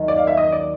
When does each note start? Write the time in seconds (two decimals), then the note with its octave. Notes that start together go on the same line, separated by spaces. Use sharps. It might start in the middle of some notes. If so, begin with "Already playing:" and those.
Already playing: D#2 D#3 F#3
0.08 D5
0.17 F5
0.27 E5
0.37 D#5
0.52 D5